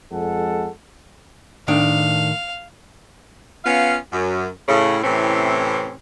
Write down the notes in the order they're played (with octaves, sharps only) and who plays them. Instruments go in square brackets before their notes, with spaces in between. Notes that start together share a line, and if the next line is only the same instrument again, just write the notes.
[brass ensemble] F2 G#3 A4 F#5
[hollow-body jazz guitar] A2 D#3 D4 [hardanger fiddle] F5
[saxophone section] B3 C#4 F4 F5
F#2
A2 C#3
A2 C3 E3 C4 C#4